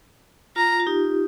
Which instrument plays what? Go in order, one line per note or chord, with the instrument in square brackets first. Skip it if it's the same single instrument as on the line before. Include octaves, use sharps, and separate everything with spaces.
[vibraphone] F4 [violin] A#5
[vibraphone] F4
D#4 G4